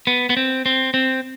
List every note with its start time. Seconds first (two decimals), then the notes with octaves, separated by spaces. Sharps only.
0.07 B3
0.30 B3
0.37 C4
0.66 C4
0.94 C4